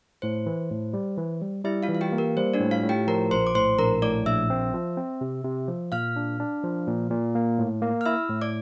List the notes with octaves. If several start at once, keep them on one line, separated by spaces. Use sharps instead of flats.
A2 C5
E3
A2
G3
E3
G3
G3 E4 E5
F4 F5
E3
F5
G4 G5
A#3
A#4
G3 C5
D4 D5
A2
F4 F5
A2
G4 G5
F3 A#4 A#5
A#1 C5 C6
D6
A2 C5 C6
A#1 A#4 A#5
A2 D5 D6
A#1 E5 E6
C4
F3
C4
C3
C3
F3
A#2 F5 F6
D4
D4
F3
A#2
A#2
A#3
A2
A#3
F6
E4 E5 E6
A2
D5 D6